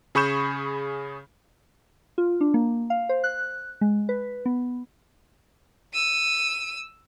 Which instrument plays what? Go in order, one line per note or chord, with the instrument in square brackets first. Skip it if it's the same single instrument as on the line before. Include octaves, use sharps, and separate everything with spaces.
[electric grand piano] C#3 G#4 B5 C#6 G6 E7
[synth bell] F4
D4
A#3
F5
C5
F#6
G#3
B4
B3
[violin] E6 D#7